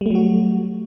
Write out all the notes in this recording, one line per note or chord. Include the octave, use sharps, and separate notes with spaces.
F#3 G3 A3 F#4